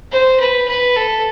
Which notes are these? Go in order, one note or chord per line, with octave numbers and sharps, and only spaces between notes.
C5
B4
B4
A4